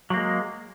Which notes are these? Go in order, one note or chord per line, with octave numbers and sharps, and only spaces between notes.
F#3 G#3 A#3